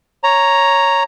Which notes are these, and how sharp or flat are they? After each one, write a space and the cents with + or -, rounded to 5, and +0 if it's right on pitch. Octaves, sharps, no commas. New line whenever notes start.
C#5 +0 A#5 +0